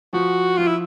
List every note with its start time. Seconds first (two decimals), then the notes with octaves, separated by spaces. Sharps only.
0.13 F3 F#4
0.57 F3 F4
0.67 E4